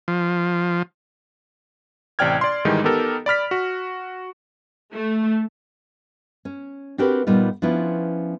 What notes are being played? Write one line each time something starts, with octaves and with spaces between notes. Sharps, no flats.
F3
A1 C3 D5 G5 F6 G#6
D5 C6
G#2 D#3 E3 G3 G#3 D#4
B3 D#4 G4 A4 A#4
D5 B5 F6 B6
F#4
A3
C#4
C4 D4 F#4 G4 A#4 B4
A#2 G3 B3 D#4 F4
F3 B3 C#4 D4 E4 F4